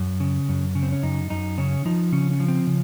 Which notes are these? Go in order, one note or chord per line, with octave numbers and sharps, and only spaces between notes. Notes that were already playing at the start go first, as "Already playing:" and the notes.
Already playing: F#2
C#3
F#2
C#3
C4
C#4
F#2 D#4
F#2 D#4
C#3 C#4
F3 D#4
C#3 C#4
C#4
F3
C4
C#3